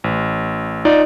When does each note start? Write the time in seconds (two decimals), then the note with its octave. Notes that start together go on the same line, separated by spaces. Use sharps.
0.04 A1
0.85 D#4 F4 D5